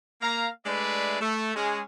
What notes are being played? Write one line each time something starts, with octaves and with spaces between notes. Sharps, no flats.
A#3 F5 A#5
G#3 A3 D4 B4 D5 E5
A3
G#3 C#4 G#4